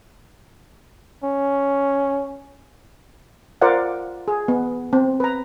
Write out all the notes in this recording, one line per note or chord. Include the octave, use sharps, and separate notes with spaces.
C#4
F4 A#4 C5 D5 F5 F#5
G#4
B3
C4
B4 A#5